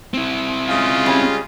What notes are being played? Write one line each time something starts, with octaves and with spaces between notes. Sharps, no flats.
C4 E4
C#3 G#3 F4
G3 C#4